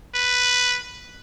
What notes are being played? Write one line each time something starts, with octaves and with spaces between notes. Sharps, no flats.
B4